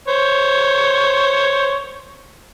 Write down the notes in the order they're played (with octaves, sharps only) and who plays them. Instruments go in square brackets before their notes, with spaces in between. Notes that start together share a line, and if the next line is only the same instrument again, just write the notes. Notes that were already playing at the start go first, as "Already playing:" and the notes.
[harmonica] C5 C#5